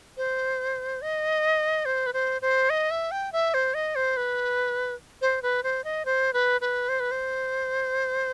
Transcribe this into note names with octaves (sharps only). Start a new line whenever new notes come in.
C5
D#5
C5
B4
C5
C5
D#5
E5
G5
E5
C5
D#5
C5
B4
C5
B4
C5
D#5
C5
B4
B4
C5
B4
C5